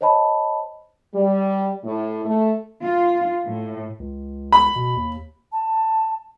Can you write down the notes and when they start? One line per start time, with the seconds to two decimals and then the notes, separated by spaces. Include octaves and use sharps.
0.01 C5 C#5 D#5 A5 B5
1.14 G3
1.84 A2
2.26 A3
2.82 F4
3.46 A2
4.00 C#2
4.52 B5
4.76 B2
4.96 D#2
5.52 A5